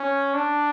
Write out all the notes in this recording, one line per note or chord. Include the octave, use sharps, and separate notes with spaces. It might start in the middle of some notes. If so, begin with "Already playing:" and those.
Already playing: C#4
D4